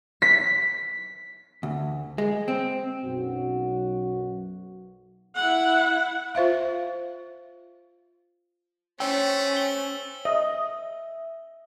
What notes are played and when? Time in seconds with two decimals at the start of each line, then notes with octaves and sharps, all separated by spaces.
0.22 B6
1.63 D2
2.18 G#3
2.48 C4
3.04 B1 F#2 F#4
5.35 E4 F#5
6.35 F4 C5 E5 F5
9.00 A3 C#4 C5 C#5 G5 E6
9.57 G7
10.25 D#5 E5